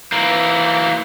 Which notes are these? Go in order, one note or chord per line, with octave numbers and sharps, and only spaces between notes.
E3 A#3